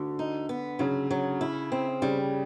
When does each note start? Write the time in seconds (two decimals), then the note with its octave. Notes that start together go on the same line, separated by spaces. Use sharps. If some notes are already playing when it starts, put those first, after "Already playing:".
Already playing: D2 D3
0.19 D#4
0.49 B3
0.79 C#3 F#3
1.11 F#3
1.41 E4
1.72 C4
2.02 C#3 G3